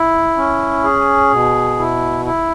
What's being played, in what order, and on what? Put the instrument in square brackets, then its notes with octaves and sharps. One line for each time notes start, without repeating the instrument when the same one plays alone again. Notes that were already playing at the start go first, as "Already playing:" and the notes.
Already playing: [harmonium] E4
C#4
G#4
B2
E4
E4